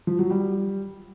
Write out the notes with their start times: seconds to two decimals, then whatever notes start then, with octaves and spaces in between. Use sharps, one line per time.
0.07 F3
0.19 F#3
0.30 G3